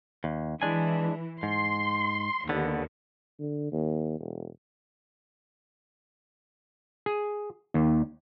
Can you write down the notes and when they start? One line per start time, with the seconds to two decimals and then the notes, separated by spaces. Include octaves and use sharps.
0.24 D#2
0.62 E3 G#3 D4 G#5
1.43 G#2 C6
2.49 D#2 D3 B3
3.39 D3
3.72 D#2
4.20 E1
7.06 G#4
7.74 D#2